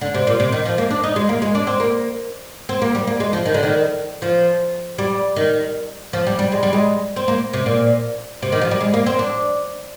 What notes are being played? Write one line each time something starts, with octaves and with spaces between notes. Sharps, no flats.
D3
C3
A#2
C3
D#3
F3
A#3
D4
D#4
G#3
A#3
G#3
D4
C4
A#3
C4
A#3
G3
A#3
G#3
F3
D#3
D3
D#3
F3
G3
D#3
F3
G3
G3
G#3
G3
G#3
C4
A#3
C3
A#2
C3
D#3
F3
G3
G#3
A#3
C4
D4